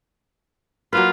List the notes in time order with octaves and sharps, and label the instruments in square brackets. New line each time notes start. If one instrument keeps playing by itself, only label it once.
[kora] F#3 A#3 B4 [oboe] F4